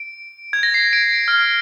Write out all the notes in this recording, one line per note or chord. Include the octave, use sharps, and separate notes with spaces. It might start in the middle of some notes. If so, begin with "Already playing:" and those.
Already playing: D7
G#6
A#6
C7
D7
F6